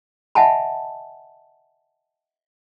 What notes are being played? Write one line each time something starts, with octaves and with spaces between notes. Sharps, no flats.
D#5 E5 F#5 G#5 A5 B5